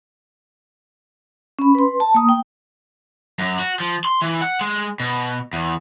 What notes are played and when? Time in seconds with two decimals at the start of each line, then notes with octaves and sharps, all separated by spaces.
1.59 C#4 B5
1.75 B4 C6
2.00 A5
2.14 A#3 D#6
2.29 G5
3.39 F#2
3.59 F#4
3.80 F3
4.05 C6
4.22 E3
4.41 F#5
4.61 G#3
5.00 B2
5.53 E2